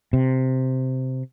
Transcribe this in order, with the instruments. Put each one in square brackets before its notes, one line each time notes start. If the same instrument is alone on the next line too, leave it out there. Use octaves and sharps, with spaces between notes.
[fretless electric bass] C3